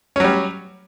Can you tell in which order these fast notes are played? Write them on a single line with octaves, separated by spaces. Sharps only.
C#4 F#3 G3